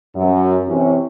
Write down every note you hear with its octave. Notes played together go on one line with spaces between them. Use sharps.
F#2
C3 E3 C#4